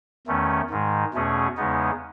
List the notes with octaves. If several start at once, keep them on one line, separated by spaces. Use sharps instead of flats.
E2 D#3 A3 C#4
G#2 D#3 G#3
E2 B2 A3 C#4 G#4
E2 C#3 G#3 B3 D#4